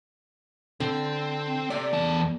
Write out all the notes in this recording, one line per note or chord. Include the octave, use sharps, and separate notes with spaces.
D3 C4
C3 D5
E2 A5